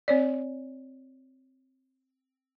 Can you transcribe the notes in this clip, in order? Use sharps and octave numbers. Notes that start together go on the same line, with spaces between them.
C4 C#5 D5